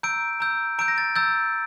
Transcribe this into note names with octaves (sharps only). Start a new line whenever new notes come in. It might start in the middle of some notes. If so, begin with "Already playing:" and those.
A#5 E6 G6 D7
A#5 E6 G6
A#5 E6 G6 D7
A#6
A6
A#5 E6 G6 A6